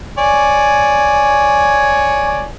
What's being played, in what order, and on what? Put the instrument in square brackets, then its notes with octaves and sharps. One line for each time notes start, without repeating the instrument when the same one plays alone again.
[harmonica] C#5 D5 G#5